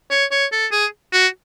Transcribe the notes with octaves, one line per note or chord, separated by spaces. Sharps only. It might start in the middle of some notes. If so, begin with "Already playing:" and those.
C#5
C#5
A4
G#4
F#4